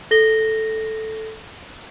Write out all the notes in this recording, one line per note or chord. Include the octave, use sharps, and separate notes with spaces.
A4 A#6 G7